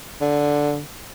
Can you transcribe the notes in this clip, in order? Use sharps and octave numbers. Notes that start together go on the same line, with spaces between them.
D3